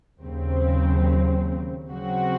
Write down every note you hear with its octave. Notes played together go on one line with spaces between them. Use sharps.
D#2 C#3 F#3 C4
C#3 F#3 C4 F#4